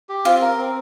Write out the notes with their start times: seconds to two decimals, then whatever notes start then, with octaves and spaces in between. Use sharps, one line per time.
0.09 G4
0.25 C4 F4
0.42 A#4
0.58 C4